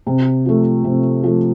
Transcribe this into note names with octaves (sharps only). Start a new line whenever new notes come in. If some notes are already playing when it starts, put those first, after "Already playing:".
C3
F3 A3
C3
F3 A3